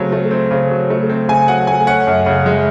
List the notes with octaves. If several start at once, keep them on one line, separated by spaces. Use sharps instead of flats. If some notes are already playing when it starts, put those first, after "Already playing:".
Already playing: C#3 F#3 A3 C4
A3
C4
C#3
F#3
A3
C4
C#3 G#5
F#3 F#5
A3 G#5
C#4 F#5
F#2
C#3
G#3